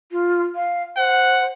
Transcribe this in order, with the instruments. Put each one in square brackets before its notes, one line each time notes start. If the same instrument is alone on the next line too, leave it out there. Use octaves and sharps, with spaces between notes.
[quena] F4
F5
[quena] C5 [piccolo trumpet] F#5